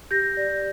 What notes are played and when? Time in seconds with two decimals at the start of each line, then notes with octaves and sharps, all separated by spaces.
0.11 G4 G6 A#6
0.37 D5